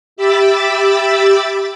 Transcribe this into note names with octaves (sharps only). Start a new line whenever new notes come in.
G4 E5 B5 D6 E6 A6